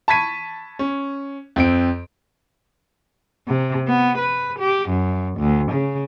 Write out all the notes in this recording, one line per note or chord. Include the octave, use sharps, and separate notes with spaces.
A5 B5 C#6 G#6 B6 D#7
C#4
F2 C4 D7
C3
B3
B4
G4
F#2
D2
C#3